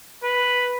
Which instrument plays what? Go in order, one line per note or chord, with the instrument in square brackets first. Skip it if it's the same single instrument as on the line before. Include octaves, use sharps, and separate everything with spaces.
[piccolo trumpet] B4